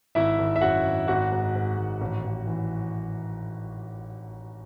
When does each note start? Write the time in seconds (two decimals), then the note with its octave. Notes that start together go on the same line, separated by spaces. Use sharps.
0.15 G#1 E4 E5
0.39 G#1
0.56 E5
0.61 F#2 F#4 F#5
0.84 G#1
1.08 G#1 F#4 F#5
1.32 G#2
1.55 G#2
1.78 G#1
2.01 A1
2.24 A1
2.47 E3